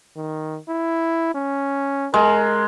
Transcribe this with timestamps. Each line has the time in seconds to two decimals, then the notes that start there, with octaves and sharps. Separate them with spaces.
0.17 D#3
0.69 E4
1.35 C#4
2.14 G#3 A#4